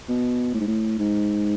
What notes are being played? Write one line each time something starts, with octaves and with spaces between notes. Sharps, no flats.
B2
A2
G#2
A2
G#2